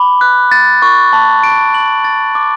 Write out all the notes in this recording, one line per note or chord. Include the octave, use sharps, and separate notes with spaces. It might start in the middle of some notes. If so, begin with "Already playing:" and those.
Already playing: B5 D6
F#6
A6
C#6
A5
D7
F#7
A6
D6